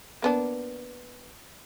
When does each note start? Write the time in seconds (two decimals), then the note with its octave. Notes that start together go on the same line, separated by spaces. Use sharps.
0.22 A#3 B3 D4